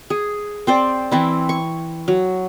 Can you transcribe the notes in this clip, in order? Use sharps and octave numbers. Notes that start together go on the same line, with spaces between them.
G#4
C4 C5 D5
E3 C4 E4
C#6
F#3